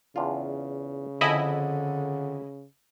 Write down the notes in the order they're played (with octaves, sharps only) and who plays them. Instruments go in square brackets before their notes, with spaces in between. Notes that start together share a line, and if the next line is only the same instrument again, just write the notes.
[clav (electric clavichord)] E2 D4 F4 [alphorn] C#3
[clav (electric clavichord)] F2 G#4 [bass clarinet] D3 [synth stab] E4 D#5 B5